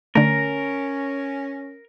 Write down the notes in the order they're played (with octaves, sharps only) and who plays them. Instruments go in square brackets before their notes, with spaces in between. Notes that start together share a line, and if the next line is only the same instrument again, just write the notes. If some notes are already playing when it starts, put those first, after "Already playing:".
[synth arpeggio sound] D3 A3 [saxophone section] C#4 [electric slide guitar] A#4